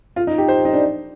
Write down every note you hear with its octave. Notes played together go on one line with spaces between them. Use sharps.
F4
D#4
G4
C5
D#4
D4